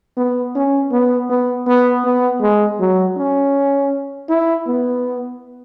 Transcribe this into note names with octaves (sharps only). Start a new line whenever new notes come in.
B3
C#4
B3
B3
B3
B3
G#3
F#3
C#4
E4
B3